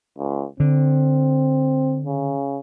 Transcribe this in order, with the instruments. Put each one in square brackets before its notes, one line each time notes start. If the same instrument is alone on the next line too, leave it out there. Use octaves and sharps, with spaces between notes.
[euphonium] C#2
[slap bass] D3 [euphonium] C4
[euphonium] C#3